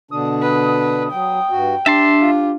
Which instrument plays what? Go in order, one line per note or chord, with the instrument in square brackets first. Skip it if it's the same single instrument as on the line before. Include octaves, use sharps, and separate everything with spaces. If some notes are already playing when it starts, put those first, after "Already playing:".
[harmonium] B2 D3 D4 [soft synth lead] D#6
[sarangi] B4
[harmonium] F#3 [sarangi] G5
[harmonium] G2 F#4
[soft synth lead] D4 [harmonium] G4 [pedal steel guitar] E5 A5 C6
[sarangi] F4